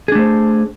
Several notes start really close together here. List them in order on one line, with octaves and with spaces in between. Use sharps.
G#4 D4 A3 C5